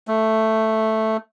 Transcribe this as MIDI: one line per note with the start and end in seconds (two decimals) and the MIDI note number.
0.08 1.17 57